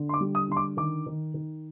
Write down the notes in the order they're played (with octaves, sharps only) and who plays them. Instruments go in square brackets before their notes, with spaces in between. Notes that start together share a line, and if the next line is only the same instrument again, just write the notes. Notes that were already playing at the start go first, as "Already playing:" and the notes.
Already playing: [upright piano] D3
C6
D6
G3
D#6
D3 C6
D6
D#3 D6
D#3
D#3